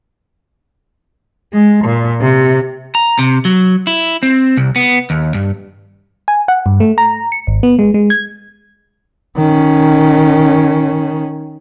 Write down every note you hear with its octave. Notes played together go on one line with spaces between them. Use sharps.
G#3
A#2
C3
A#5
C3
F#3
E4
C4
C2
B3
D#2
G2
G#5
F#5
G2
A3
A#5
C#7
G#1
B3
G#3
G#3
G#6
D#3 C#4